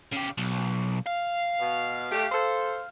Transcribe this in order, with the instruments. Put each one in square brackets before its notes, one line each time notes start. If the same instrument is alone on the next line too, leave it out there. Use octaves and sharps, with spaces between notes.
[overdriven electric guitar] C#3 G4
B1
F5
[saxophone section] B2
A3 G4
A4 C5